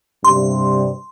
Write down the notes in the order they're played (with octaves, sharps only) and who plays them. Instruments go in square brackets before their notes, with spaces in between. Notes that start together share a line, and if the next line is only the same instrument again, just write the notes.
[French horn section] G2 C3 G3 [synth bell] C6